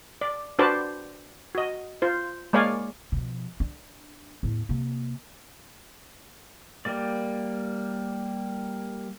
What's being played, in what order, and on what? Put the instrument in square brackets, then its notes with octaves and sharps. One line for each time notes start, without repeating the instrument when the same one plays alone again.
[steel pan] D5
D4 F#4 B4 C5 D5 A5
F#4 D#5
F4 C5
G#3 A#3 C#5 D5 F5 G#5
[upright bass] B2 F3
D4
E2 A2
C3 A#3
[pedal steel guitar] G3 A#3 D5